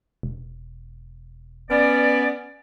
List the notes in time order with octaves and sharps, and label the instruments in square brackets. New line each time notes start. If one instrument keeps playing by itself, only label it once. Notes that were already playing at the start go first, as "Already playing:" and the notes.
[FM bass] E1
[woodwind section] B3 C#4 D5